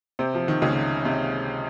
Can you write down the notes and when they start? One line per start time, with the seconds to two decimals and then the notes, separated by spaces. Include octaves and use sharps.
0.19 C3 C4
0.34 F3
0.48 D#3
0.62 C#2 C#3
1.05 C3